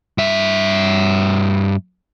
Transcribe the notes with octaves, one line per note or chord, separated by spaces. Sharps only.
G2 E5